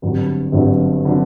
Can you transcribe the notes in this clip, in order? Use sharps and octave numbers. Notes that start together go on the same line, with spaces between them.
G1 G2 D3 F#3 C4
G1 G2 D3 F#3 C4
D3 F#3 C4